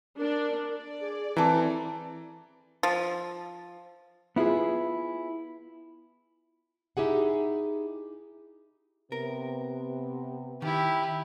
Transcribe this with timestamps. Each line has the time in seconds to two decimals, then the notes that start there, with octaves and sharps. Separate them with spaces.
0.18 D4 A#4
0.66 D5
1.01 G#4
1.37 E3 C4 A4 A#4
2.83 F3
4.36 B3 E4 F4 G#4
6.97 D#4 E4 G4 G#4 F#5
9.12 C3 B3 A#4
10.62 D#3 E4 G4